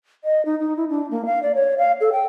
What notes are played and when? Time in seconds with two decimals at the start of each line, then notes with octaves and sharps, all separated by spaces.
0.24 D#5
0.45 D#4
0.60 D#4
0.77 E4
0.89 D4
1.11 A#3
1.26 F5
1.43 D5
1.55 C#5
1.78 F5
2.01 A4
2.12 G5